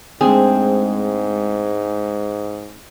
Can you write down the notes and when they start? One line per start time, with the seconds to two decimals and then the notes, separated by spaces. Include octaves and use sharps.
0.21 G#2 G#3 A3 C4 D4 G#4